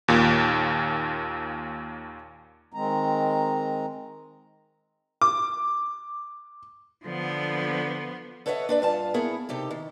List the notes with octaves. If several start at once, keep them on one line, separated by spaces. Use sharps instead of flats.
D#2 A#2
D#3 G#3 C4 A#5
D6
D3 F3 B3
A4 B4 C#5 D#5 E5 F#5
D4 B4 D5
G2 F4 A5
B3 E4 G#4 A#4 C#5
C3 D#4 G4 A4
D#3